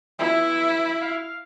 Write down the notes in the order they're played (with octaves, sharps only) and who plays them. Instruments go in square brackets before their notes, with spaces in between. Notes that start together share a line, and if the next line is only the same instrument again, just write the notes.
[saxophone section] B3 E5 [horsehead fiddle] E4
[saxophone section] F5